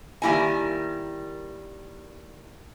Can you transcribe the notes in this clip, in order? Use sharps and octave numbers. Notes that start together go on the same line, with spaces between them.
D#3 G3 A#3 E4 D#5 G#5